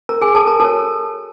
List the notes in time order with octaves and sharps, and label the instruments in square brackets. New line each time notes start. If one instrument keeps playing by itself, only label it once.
[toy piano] A#4 A#5
G#4 G#5
A4 A5
A#4 A#5
F#4 A4 A#4 C#5 A5